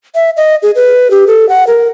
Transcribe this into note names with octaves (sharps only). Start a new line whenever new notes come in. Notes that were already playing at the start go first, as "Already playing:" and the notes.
E5
D#5
G#4
B4
G4
A4
F#5
A#4